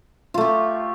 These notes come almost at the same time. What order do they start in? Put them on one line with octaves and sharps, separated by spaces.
F4 A3 G4